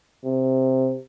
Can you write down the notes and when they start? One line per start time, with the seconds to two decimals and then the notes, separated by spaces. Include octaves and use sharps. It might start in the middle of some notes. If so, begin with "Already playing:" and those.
0.24 C3